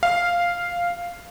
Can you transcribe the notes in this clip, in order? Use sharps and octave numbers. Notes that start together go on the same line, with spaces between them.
F5